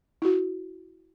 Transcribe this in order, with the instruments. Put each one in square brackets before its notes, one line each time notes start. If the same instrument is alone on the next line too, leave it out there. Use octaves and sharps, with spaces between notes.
[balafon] E4 F#4